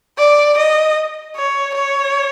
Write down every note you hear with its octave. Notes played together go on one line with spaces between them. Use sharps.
D5
D#5
C#5
C#5